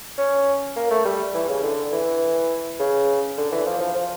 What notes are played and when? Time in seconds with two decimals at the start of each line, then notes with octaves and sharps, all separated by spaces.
0.18 C#4
0.76 A#3
0.91 A3
1.05 G3
1.34 E3
1.48 C#3
1.63 D3
1.92 E3
2.79 C#3
3.38 D3
3.52 E3
3.66 F3
3.81 F3
3.96 F3